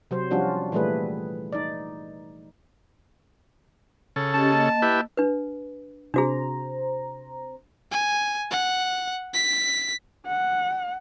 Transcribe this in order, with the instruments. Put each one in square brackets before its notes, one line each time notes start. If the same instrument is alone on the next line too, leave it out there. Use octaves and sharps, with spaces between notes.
[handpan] C3 F#3 C5
F3 G3 C#4 D4 F4 F#4
A#2 E3 G3 A3 G#4 B4
D#4 D5
[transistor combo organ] C#3 A4
[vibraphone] C#4 G4 D#5 [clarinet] A5
[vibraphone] A#3 D#5
[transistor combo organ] E4 G4 B4
[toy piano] D4 B4
[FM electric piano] C3 C5 A#5 [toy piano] D4 F#4 G#4
[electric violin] G#5
F#5
B6
[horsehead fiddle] F#5